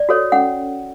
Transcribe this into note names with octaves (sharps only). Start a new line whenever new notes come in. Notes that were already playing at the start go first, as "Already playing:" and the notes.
Already playing: D5
F#4 A4 C#5
C#4 F#5